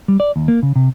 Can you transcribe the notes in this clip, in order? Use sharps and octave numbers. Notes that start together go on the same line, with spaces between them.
G3
D5
D#2
A#3
C#3
C3